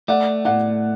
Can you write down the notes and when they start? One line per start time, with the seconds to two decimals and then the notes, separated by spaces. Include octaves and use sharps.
0.08 A3 D5 F#5
0.45 A2 D5 F#5